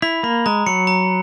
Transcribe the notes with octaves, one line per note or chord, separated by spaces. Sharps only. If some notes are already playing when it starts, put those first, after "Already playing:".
E4 B5
A#3 B5
G#3 A#5
F#3 C#7
A#5